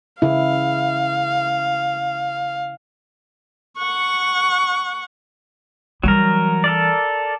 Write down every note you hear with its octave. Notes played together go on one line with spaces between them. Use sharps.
C#3 E4 F5
F#5 C#6
E3 F#3 G3 A#4
A4 A#4 D5